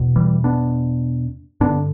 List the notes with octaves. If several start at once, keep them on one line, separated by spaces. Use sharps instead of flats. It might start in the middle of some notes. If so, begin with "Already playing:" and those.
Already playing: E2 B2
E3 G3
B3 D4
G2 D3 B3 D4